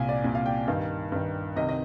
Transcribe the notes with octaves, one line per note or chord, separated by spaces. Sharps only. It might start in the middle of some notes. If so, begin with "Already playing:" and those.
Already playing: C2 A#2 F5 G#5
D5
C2 A#2
F5
G5
G2 D#3 F5
G2 D#3
C2 C3 D#3 D#5
D#5